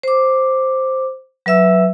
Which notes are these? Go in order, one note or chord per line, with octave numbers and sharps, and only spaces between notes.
C5 D6
F#3 B4 E5 E6